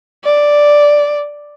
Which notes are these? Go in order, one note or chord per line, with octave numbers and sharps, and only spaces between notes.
D5